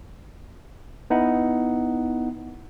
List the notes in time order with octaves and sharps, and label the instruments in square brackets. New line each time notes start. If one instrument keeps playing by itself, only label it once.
[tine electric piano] B3 D#4 E4 F#5